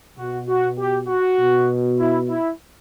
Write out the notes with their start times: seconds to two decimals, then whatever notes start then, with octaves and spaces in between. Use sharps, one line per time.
0.18 B2 F#4
0.48 F#4
0.78 G4
1.08 F#4
1.39 B2
1.98 E4
2.29 E4